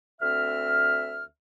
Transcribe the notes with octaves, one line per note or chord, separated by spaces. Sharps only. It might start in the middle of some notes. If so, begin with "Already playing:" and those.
D2 C4 E5 F6